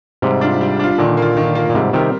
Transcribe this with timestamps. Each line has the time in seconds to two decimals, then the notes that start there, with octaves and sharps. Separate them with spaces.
0.22 G#2 C3 G3
0.41 D4 F4
0.61 G3
0.79 D4 F4
0.98 A#2 D3 D#3
1.17 A#3
1.22 F4
1.37 D#3
1.55 A#3 F4
1.69 A#2
1.74 G#2 C3 G3
1.93 C3 D#3 C4 G4 A#4